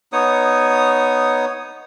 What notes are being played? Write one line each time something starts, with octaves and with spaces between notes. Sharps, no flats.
B3 D#4 C#5 D#6